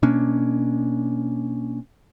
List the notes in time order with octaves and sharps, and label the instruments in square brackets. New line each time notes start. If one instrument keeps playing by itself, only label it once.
[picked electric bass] B2 A#3 C#4 D4